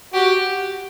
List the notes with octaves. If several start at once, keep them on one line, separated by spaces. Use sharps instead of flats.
F#4 G4